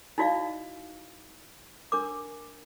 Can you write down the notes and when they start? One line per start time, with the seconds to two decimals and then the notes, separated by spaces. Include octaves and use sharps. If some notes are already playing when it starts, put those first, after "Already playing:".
0.18 D#4 E4 F#4 D5 D#5 F5
1.92 D4 A#4 D6